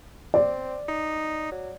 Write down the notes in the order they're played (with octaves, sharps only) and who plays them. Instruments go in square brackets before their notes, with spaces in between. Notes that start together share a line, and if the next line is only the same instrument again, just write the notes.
[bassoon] C4 [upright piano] D5
[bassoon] D#4
F#3